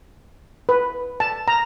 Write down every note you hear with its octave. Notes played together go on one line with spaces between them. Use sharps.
B4
A5
A#5